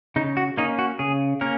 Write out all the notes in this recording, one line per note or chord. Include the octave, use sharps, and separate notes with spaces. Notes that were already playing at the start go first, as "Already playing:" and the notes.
C#3 D#4
F#4
A#3 C#4 D#4
F#4
C#3 G#4
A#3 C#4 A#4